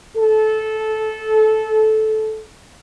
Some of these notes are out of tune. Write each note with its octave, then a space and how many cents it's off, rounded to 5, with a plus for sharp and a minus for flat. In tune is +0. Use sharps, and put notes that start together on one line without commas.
A4 -15